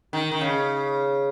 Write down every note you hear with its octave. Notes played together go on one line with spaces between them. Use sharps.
D#3
D#3
C#3